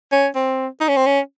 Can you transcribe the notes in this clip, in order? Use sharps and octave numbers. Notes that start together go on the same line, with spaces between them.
C#4
C4
D#4
C#4
C4
C#4